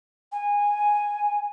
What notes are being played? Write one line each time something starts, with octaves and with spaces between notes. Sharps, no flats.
G#5